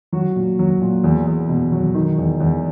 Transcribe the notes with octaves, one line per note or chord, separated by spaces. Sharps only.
F#3 F#4
A#2
F#3
A#2
E2
E2
B2
F#3
D#3
E2
E2